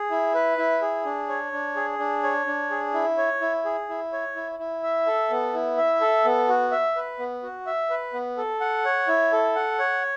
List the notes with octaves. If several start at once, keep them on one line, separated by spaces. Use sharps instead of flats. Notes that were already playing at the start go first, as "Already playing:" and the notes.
Already playing: G#4
E4
B4
E4
G#4
D4
C#5
D4
G#4
D4
C#5
D4
G#4
E4
C#5
E4
G#4
E4
C#5
E4
E4
E5
A4
B3
E4
E5
A4
B3
F#4
E5
B4
B3
F#4
E5
B4
B3
A4
F#5
C#5
E4
A4
F#5
C#5